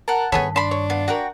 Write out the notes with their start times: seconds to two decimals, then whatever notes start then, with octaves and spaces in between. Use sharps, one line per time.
0.08 A#4 F#5 A5
0.32 G2 D#3 B3 G#4 A4 C#5 B5
0.56 D4 A5 B5 C6
0.71 C#5
0.90 B3 F4
1.08 F#4 A#4 F#5 G5